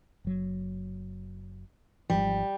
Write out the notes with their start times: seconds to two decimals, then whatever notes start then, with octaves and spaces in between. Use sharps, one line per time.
0.24 F#1 F#3
2.10 G#1 G#2 F3 G3